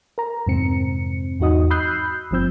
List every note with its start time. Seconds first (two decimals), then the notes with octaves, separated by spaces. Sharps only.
0.18 A#4 A#5
0.46 F2 G#2 C3 C4 C#7
1.40 E2 G#2 D#4 F#4 D#5 D#6
1.70 B5 D#6 E6 F#6 G6 C7
2.31 G1 G2 F3 C4 E6 G6